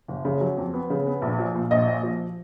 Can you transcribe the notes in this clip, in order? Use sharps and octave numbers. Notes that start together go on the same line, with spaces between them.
F#1
C#3
F#3
F2
B3
C#3
B3
A#1
F3
A#2
A#1 D#5
A#2
F3